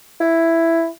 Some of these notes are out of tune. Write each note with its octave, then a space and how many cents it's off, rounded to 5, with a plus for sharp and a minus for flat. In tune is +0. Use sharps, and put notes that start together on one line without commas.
E4 +5